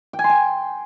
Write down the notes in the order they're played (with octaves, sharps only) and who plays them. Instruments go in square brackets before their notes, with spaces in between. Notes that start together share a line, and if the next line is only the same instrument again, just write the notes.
[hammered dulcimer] G5
G#5
C6
G5